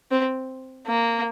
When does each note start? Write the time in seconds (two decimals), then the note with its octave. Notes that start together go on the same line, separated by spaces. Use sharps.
0.11 C4
0.86 A#3